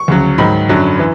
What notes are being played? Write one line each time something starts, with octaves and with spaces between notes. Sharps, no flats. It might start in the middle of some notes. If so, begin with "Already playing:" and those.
Already playing: C#6
D2 C#3 F#3
G#2 D#3 F#3 B5
F#2 D3 F#3
E3